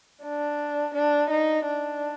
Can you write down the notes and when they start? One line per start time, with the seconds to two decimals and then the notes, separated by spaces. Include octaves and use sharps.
0.23 D4
0.95 D4
1.30 D#4
1.65 D4